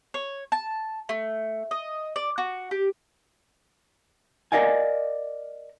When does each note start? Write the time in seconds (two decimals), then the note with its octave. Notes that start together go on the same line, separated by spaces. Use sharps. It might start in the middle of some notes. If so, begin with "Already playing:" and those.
0.14 C#5
0.52 A5
1.09 A3
1.71 D#5
2.16 D5
2.38 F#4
2.71 G4
4.52 A#4 C5 D5 D#5 F5 G#5